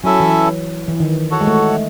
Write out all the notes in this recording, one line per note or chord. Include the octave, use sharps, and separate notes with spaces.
F#3 C#4 E4 A4 E5
E3
E3
D#3
F#4 A4 C#5 F#5
G#3
A3